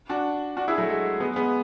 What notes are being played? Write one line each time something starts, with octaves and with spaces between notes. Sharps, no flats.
D4 F#4
D4 F#4
E4 G#4
F#3 A3
G#3
G#3 B3
G#3 B3